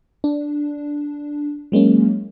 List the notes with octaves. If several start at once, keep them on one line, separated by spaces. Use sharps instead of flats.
D4
F#3 G#3 A#3 C#4